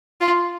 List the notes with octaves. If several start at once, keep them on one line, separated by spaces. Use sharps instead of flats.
F4